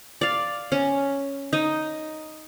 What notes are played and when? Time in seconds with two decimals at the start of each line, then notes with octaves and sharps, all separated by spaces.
0.21 D5 F5
0.72 C#4
1.53 D#4 D#5